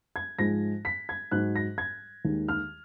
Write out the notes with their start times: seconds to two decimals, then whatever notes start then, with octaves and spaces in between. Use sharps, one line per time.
0.16 G#6
0.38 G#2 F3 G#3 A#6
0.85 B6
1.09 G#6
1.31 G#2 F#3 F#6
1.56 A#6
1.78 G#6
2.25 D#2 D#3 G#3
2.48 F6